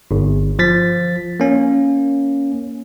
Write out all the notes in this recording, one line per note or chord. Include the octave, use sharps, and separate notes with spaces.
G1
F3 A6 B6
A#3 C#4